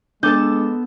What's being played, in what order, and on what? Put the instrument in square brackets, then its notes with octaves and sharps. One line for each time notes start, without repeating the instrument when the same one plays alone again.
[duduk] G#3 [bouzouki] B3 A4 A5 [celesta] D4 D6 [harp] G6